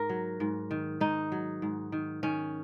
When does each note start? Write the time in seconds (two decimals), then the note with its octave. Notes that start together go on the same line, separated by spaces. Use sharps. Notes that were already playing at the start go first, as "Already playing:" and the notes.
Already playing: G#2 A#4
0.09 F#3
0.40 G#2
0.71 D#3
1.01 G#2 D#4
1.32 F#3
1.62 G#2
1.92 D#3
2.23 D#3 C#4